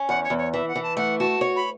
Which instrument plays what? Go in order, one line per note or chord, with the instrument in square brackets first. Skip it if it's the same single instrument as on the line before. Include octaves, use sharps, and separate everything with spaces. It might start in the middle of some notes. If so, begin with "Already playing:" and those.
Already playing: [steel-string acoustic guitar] C#4
[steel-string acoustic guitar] E2 [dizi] F#5
[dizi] C#5
[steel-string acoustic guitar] E2
[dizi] C#5
[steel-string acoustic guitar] E3 [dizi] E5
[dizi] F#5
[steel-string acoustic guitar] E3
[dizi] A5
[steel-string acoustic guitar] A3 [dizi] F#5
[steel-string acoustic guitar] F#4 [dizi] A5
[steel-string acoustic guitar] C#5
[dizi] B5